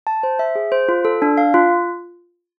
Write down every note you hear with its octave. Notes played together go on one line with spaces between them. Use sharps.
A5
C5
E5
G#4
C5
F4
A4
D4
F5
F4